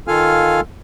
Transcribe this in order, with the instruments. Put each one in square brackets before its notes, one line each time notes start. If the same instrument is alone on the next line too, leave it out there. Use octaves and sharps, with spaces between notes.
[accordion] D#3 F4 A4 F5 G#5 F6